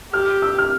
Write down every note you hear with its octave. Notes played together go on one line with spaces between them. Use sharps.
G4 F6
E6
F6